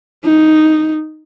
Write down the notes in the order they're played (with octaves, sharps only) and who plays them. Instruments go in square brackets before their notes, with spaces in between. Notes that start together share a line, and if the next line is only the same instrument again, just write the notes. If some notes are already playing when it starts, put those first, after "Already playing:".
[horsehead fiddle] D#4